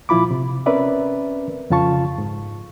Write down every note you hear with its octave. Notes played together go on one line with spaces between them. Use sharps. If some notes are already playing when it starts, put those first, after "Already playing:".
A#2 F3 E4 F4 B5 D6
C3
C4 C#4 A#4 B4 D5 E5
F2 C#3 F4 F5 A5 C#6
G#2